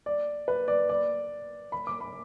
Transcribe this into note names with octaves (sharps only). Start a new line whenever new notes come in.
D5
B4
D5
D5
B5
D6
B5